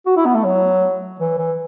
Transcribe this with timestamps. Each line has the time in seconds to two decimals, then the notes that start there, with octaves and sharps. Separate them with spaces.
0.06 F#4
0.17 E4
0.25 B3
0.35 A3
0.44 F#3
1.20 E3
1.38 E3